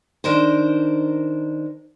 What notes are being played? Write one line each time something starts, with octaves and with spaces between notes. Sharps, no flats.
D#3 D4 A#4 C5